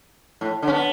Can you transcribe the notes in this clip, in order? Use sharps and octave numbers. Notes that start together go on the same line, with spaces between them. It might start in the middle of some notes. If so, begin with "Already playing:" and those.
A2
D3
C#4
B3